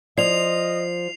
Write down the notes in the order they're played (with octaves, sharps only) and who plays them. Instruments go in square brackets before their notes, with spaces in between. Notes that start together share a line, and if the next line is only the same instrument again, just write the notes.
[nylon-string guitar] F3 [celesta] D5 [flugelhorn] D#5 [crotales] C7 F7